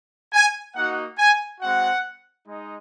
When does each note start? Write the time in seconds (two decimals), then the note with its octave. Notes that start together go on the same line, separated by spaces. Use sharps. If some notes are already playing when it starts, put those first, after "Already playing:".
0.33 G#5
0.75 A#3 D#4 F#4 F#5
1.19 G#5
1.60 G#3 C4 F#4 F#5
2.47 G#3 D#4